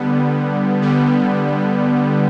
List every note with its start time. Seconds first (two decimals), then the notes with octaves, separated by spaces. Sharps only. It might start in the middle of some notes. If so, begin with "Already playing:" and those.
Already playing: D3 G3 B3
0.82 D3 G3 B3